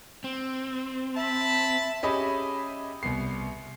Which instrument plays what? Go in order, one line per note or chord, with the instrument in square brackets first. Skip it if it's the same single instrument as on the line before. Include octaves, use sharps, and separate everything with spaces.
[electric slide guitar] C4
[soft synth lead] E5 [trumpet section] A5 B5
[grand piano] C#4 G4 G#4 D#5 E5 B5
C2 B3 C7